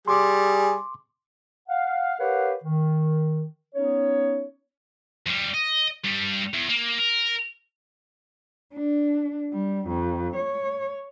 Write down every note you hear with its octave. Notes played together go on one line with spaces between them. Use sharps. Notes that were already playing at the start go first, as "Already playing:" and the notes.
G3 G#4 C6 D6
F5 F#5
G4 A#4 B4 C#5 F5 F#5
D#3
B3 C#4 D#4 C#5
F2 G3
D#5
G2 G3
E2
A#3
A#4
D4
G3
F2
C#5